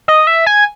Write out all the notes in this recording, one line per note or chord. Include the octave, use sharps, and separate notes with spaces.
D#5
E5
G#5